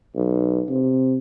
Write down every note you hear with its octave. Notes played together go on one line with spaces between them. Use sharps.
B1
C3